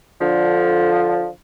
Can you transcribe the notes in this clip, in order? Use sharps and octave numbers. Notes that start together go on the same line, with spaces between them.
D3 F3